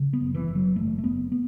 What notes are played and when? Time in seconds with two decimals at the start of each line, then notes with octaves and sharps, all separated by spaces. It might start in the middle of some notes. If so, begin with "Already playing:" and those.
Already playing: C#3
0.13 B3
0.20 F#1
0.35 E3
0.48 F#1
0.55 F#3
0.76 F#1 A3
0.98 A3
1.04 F#1 B3
1.32 B3